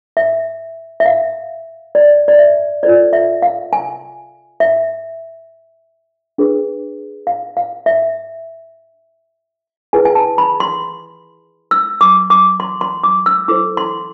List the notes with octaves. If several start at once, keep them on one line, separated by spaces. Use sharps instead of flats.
E5
E5
F5
D5
D5
E5
F4 A4 C5 D5
E5
F5
G#5
E5
D4 G#4 B4
F5
F5
E5
E4 G#4 B4 G#5
G#5
A5
B5
C6
E6
D6
D6
C6
C6
D6
E6
E4 A4 C5 D6
C6